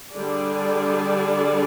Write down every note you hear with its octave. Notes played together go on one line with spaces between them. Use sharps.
D3 G3 D4 G#4 D5